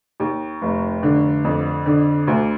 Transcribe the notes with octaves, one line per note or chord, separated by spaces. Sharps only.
D#2
F1
D3
F2
D3
D2